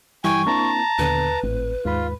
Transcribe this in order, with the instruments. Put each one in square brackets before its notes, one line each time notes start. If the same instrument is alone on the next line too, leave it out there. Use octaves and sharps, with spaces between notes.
[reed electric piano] G2 E3 G3 [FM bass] E4 [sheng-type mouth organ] G5 G#5 [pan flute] C#6
[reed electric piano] A#3 C4 E4 [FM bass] D4 [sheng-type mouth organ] A5 A#5
[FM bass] D#2 [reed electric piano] A#2 D3 B3 [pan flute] B4
[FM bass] G#1 [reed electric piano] A2 C4
[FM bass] D#2 [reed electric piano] G#2 B5 [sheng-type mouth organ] F4